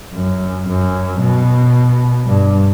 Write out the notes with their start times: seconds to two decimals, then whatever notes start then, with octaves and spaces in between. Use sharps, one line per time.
0.14 F#2
0.68 F#2
1.19 B2
2.26 G2